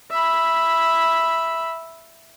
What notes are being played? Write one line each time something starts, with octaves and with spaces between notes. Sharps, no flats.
E5 B5